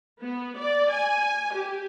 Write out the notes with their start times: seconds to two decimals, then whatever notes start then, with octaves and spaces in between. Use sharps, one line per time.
0.22 B3
0.58 D5
0.92 G#5
1.54 G4